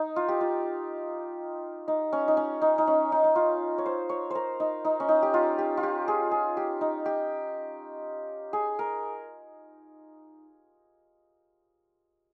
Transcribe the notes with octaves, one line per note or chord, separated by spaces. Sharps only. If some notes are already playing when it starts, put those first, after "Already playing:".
Already playing: D#4
F4
G4
F4
D#4
C#4
D#4
C#4
D#4
D#4
C#4
D#4
D#4
F4
C#5
C5
C#5
A#4 C5
D#4
D#4
C#4
D#4
G4
F4
G4
F4
G4
G#4
G#4
G4
D#4
G4
G#4
A#4